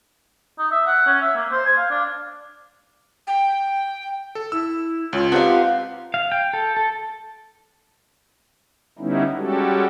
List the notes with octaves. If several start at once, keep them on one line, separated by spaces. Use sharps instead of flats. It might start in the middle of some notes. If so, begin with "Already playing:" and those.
D#4
E5
F#5
C#4
E5
A#3
C5
G#5
F5
D4
G5
A4
E4 E6
C#2 F4 C#5
B3 C4 D#4 G4 F5 A5
F5
G5
A4
A4
D3 G3 B3 C#4 D#4 E4
G3 G#3 C#4 F#4 G4 A4